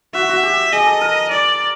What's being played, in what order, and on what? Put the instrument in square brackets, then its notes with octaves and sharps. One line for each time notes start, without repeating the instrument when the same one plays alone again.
[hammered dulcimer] F#4 [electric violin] E5
[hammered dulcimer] F#4
G4
[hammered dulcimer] G#4 [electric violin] D#5
[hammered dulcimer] A4
A#4
[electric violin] D5